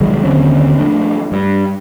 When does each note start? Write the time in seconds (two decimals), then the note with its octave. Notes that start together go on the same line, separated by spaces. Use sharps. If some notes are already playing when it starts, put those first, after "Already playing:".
0.01 C2 D#3 F#3 G#3
0.23 D#2 D3 C4 C#4
0.78 F3 A3 D4
1.32 G2